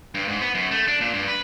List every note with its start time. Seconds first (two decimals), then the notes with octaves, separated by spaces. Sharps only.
0.15 G2
0.28 G#2
0.41 B3
0.55 F#2
0.71 A3
0.88 D4
1.01 A#2
1.14 G2
1.28 B4